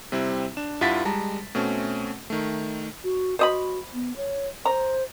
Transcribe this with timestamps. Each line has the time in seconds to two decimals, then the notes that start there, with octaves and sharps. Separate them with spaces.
0.12 C3 G3 C4 E4
0.57 D4 E7
0.81 G2 E4 F4 F#5 A6 B6
1.05 G3 G#3 A5 A#5
1.55 B2 A3 C4 C#4
2.30 D#3 A3
3.03 F#4
3.39 F#4 C5 D#5 B5
3.94 B3
4.16 C#5
4.65 C5 A#5